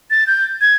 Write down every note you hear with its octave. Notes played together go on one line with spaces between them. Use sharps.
A6
G6
G#6